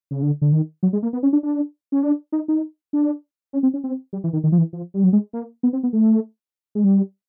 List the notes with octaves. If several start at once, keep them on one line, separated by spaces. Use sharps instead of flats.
C#3
D3
D3
D#3
F#3
G#3
A#3
B3
C#4
D4
D4
C#4
D4
D#4
D#4
D4
C#4
C4
C#4
C4
G3
E3
D#3
D#3
F3
E3
F3
G3
F#3
G#3
A#3
B3
C4
B3
A3
G#3
G3